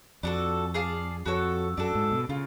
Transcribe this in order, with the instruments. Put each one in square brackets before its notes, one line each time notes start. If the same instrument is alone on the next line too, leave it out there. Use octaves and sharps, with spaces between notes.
[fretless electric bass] F2 [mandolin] D4 F#4 A4
[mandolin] G#4 D5 F5 A5
[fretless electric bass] F2 [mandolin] F#4 A4 C#5
[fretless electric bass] F#2 [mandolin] D4 F#4 A4
[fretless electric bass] G#2
B2
[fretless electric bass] C#3 [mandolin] F4